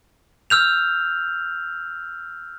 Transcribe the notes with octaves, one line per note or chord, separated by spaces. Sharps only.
E6 F6 G6 F7